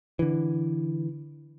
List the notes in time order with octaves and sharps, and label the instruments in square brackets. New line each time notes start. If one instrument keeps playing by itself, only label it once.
[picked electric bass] D3 E3